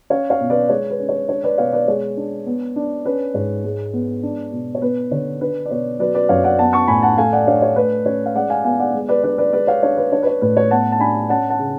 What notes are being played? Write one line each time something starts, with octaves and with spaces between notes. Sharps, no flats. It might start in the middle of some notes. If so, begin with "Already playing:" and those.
C#4 C#5 F5
C#5 F5
B2
B4 D5
G#3 C#5
B4
C#4
C#5
D4 C#5
B4 D5
B2 C#5 F5
B4 D5
G#3 C#5
D4
B3
D4
C#4 B4
G#2 C#5
G#3
B3
D4
B2
C#5
B3 B4
D3 C#5
D4 B4
D5
B2 C#5
F#3 B4 D5
B4 D5
F#2 C#5 F5
D5 F#5
B3 F#5 A5
A5 C#6
A2 G#5 B5
F#5 A5
A3 F5 G#5
D5 F#5
D4 C#5 F5
C#5
A3 B4
C#4 C#5
F5
G#3 D5 F#5
F5 G#5
B3 F5 G#5
D5 F#5
G#3
B4 D5
D4 B4 D5
B4 D5
G#3 B4 D5
C#5 F5
D4 C#5
B4
D4 C#5
B4
C#5
A2 B4
C#5
B3 F#5 A5
A5
D4 G#5 B5
C#4 F#5 A5
F#5 A5
C#3